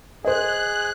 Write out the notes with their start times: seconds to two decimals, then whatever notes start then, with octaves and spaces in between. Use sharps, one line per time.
0.25 G#4 C5 D#5 F#6